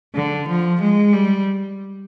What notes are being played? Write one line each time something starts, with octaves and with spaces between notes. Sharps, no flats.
D3
F3
G#3
G3